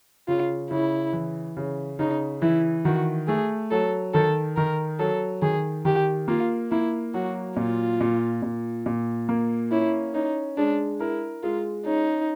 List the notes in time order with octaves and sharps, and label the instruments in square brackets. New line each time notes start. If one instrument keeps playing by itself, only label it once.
[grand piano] C#3 [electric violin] F4
[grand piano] C#3 [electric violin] E4
[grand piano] E3
C#3
[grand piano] C#3 [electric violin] D#4
[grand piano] E3 [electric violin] E4
[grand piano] D#3 [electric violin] F#4
[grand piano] A3 [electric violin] G#4
[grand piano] F#3 [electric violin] A4
[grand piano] D#3 [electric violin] A4
[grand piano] D#3 [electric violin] A#4
[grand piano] F#3 [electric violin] A4
[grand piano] D#3 [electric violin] G#4
[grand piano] D#3 [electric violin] G4
[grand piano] A#3 [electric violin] F4
[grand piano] A#3 [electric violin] E4
[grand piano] F#3 [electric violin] F#4
[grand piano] A#2 [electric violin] F4
[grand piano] A#2
A#2
A#2
A#3
[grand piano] C#4 [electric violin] E4
[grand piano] C#4 [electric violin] D#4
[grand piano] G#3 [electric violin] D4
[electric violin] E4 [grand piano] A#4
[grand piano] G#3 [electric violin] F4
[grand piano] C#4 [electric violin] D#4